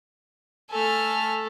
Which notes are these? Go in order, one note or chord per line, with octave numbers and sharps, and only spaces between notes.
A3 A4 G#5 F6